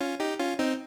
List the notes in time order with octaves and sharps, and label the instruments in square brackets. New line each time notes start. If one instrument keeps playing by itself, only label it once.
[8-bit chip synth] C#4 F4
D#4 G4
C#4 F4
C4 D#4